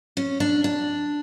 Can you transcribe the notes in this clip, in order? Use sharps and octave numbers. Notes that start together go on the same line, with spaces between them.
C#4
D4
D4